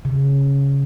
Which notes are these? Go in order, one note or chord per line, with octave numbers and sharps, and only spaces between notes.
C#3